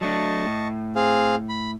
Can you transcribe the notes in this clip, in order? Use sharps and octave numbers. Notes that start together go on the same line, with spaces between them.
F#3 A3 D4 D#5 A5 C#6
A2
C4 G#4 F5
B5